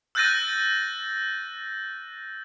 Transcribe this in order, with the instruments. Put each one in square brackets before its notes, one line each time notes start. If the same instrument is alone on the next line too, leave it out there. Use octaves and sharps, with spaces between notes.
[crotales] E6 F#6 G6 A6 A#6 D#7